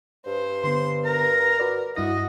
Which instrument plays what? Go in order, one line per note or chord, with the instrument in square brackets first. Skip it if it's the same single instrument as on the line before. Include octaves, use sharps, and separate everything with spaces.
[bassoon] G2 [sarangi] C5
[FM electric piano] D3 B3 [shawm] C6
[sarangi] A#4 [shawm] A#5
[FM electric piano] F#4 B4 D5
[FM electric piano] G2 E4 A#6 [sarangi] F#4 [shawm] D#5